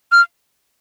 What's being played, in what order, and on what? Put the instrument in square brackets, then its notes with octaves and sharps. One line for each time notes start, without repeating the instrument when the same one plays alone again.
[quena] F6